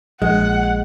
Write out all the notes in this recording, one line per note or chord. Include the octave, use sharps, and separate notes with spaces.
A#1 G#3 F#5